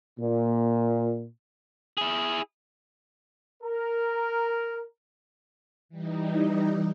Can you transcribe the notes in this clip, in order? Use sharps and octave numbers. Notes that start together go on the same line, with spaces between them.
A#2
E4 G#4
A#4
E3 G3 D#4